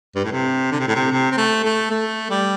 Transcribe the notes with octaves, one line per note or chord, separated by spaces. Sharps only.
G2
A2
C3
D3
C3
A2
C3
C3
C4
A3
A3
A3
G3